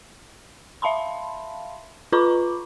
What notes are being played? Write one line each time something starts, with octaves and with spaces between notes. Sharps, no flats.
E5 F5 A5 B5 C6
F4 B4 A#5 B5 C#6 D6